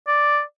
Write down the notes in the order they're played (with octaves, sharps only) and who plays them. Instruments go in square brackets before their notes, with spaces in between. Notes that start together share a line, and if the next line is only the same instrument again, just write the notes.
[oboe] D5